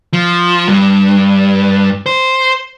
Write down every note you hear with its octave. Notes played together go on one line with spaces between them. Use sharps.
F3
G2
C5